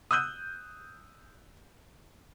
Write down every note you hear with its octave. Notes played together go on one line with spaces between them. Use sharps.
D#6 E6 F#6 G6 D#7